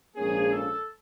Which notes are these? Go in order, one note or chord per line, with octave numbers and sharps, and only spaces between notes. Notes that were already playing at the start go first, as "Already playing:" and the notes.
A#1 G#2 F3 A#3 C#4 G#4
A4